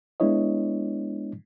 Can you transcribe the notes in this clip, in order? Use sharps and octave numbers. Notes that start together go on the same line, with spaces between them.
G#3 B3 D4 E4 C#5 D#5